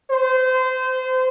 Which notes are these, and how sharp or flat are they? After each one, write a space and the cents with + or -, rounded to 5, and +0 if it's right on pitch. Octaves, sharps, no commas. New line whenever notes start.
C5 -25